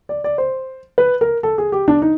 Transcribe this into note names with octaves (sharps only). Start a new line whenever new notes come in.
D5
D5
C5
B4
A#4
A4
G#4
G4
D4
D#4